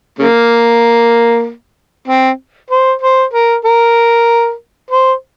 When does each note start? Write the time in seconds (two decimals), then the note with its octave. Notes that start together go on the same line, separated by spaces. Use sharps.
0.19 C#3 A#3
2.08 C4
2.71 C5
3.02 C5
3.33 A#4
3.65 A#4
4.91 C5